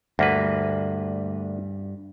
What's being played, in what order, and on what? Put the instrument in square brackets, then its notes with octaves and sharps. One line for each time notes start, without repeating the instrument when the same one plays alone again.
[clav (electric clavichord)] D2 A#3 B4 [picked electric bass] G2